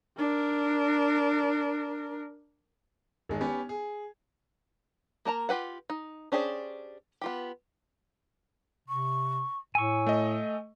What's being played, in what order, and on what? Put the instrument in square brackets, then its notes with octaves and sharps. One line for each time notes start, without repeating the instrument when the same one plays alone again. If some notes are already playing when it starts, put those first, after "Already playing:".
[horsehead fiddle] D4 A#4
[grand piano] G#1 G#3
B3 C#4 G4
G#4
[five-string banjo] A#3 A#4 A5 A#5
F4 G4 B4 F#5
D#4
C#4 D4 G4 G#4 C5
B3 F4 G4
[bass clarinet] C3 [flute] C#6
[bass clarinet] A2 [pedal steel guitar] G#5 C#6 [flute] E6
[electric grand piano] A3 D#5